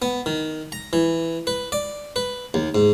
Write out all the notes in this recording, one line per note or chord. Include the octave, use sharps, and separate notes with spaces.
B3
D#3
A#5
E3
B4
D5
B4
D#2
G#2